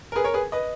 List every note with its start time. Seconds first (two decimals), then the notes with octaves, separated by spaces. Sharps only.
0.12 A#4
0.16 G#4 B4
0.24 A#4 C#5
0.34 G#4 B4
0.52 B4 D#5